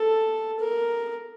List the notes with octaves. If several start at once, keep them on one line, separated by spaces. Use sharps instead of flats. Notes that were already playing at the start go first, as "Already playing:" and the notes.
Already playing: A4
A#4